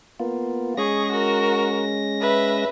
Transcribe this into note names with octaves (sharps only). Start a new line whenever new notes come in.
A#3 B3 F4
G#3 C#4 G#4 C#6 A#6
F#4 A#4
B4 E5